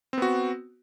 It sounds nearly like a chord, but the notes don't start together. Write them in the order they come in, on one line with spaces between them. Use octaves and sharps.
C4 B3 F#4